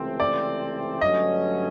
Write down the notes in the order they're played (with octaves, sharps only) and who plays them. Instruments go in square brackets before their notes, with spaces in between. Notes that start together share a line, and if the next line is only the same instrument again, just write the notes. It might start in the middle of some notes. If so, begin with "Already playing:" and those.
Already playing: [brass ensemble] C#2 C3 E3 A3 C4
[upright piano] D5
[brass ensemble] G2 D3 F#3 A3 C#4 [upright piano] D#5